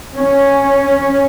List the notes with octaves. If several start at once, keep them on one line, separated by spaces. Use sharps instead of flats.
C#4